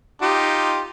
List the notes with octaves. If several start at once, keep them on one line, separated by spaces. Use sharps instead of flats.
D#4 F4 G4